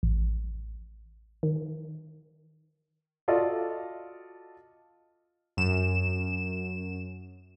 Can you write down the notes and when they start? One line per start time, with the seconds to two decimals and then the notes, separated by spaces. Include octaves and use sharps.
0.03 A1
1.43 D#3
3.28 F4 F#4 A4 D5 D#5 F5
5.57 F#2 E7